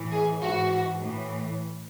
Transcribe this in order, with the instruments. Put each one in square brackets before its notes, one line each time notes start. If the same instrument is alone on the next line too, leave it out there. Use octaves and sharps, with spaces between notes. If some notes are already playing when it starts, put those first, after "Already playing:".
Already playing: [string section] A2 E3
G#4
G#2 E3 F#4
A2 E3